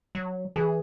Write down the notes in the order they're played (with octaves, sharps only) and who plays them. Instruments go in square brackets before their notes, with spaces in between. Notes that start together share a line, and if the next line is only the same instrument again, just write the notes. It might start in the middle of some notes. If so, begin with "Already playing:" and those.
[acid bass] F#3
[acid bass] E3 [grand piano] G#4